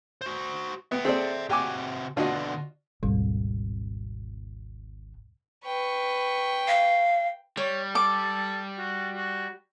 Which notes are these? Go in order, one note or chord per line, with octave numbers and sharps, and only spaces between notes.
F#4 C5
B3 E5 G5
C4 G#4 A4 C5 D5
C3 F#4 G4 G#5 D6
B2 D3 D4 F4 F#4 D#5
G#1 D2 B2 G3
B4 G5 C#6
F5
G3 C#5
A4 D6
F#4
F#4